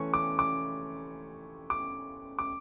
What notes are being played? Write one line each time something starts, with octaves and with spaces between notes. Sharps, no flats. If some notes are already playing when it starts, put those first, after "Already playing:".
Already playing: E3 A3 C#4 C#6
D6
D6
D6
D6